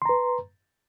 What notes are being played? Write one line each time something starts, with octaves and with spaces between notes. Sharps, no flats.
B4 A#5 C6